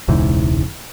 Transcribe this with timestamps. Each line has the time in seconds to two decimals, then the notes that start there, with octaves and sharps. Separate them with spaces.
0.08 E1 C#2 G#2 E3